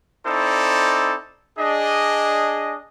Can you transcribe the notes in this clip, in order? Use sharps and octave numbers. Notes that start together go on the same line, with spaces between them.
C4 D#4 E4 A4 C5 D5
D4 G#4 D#5